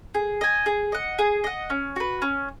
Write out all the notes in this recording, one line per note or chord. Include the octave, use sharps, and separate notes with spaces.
G#4
D#5 G#5
G#4
D#5 F#5
G#4
D#5 F#5
C#4
F#4 B4
C#4